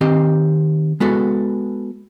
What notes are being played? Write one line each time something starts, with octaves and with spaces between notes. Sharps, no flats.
D#3 C4 G4 D#5
G#3 B3 F#4 A4